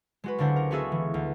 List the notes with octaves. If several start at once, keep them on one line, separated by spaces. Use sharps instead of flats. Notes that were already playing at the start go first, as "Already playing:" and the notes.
G#3 F#4 B4
C#2 D3 D4 C5 F#5
A#4
B3 C#4 F#4 G#4 A4 E5
E3
D2